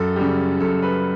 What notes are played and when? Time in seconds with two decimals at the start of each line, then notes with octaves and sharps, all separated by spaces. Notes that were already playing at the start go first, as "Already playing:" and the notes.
Already playing: F#2 A4
0.16 C#3 G3
0.60 F#2 A4
0.82 B4